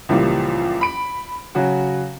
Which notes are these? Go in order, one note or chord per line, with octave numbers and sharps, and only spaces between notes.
C#2 A#2 E3 F3 G3 A#3
B5 D7
C#3 F#3 F#4